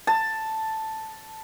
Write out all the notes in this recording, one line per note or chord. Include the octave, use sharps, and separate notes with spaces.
A5